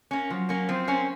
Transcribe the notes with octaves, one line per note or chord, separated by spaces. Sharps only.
A#3 C#4
F3 F#3
A#3 C#4
F3 C4
A#3 C#4